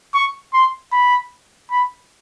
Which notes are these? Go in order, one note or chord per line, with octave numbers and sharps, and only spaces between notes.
C#6
C6
B5
B5